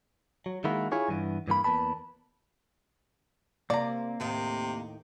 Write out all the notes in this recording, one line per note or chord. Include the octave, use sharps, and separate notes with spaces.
F#3
D#3 G#3 A#3 E4 F#4
E4 F4 G#4 C#5
G2 E3 B3
G2 E3 A#3 B5
E2 G#2 A#3 B4 A5 B5
C3 A#3 D5 A#5
D#2 A2 C3 D#3